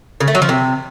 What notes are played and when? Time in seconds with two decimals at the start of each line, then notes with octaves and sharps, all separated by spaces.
0.20 C#3
0.28 A3
0.35 F#3
0.42 F3
0.49 C3